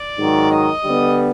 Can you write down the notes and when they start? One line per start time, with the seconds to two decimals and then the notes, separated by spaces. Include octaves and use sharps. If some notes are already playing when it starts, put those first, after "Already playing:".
Already playing: D5
0.18 G#2 D#3 F#3
0.51 D#5
0.84 D3 G3 B3